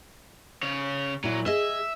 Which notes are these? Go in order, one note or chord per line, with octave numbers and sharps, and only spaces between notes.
C#3 C#5
A#2 F#3 E4
G#4 D#5 E5